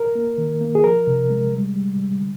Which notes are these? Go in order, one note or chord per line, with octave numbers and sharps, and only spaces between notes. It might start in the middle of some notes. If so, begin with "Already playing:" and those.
Already playing: A#4
A#3
D#3
A#3
G#4
F3 A#4
C3
G#3
G3
G3
G3
D3